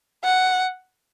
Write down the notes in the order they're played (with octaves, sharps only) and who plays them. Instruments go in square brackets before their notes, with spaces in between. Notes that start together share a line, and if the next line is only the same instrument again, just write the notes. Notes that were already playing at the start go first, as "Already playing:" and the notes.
[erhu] F#5